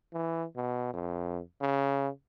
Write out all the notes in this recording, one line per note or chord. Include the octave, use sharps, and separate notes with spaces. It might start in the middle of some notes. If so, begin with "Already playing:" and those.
E3
B2
F2
C#3